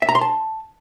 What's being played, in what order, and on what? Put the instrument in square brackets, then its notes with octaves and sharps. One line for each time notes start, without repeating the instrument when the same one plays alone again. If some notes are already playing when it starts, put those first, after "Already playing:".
[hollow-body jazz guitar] E5
A#5
C6
A5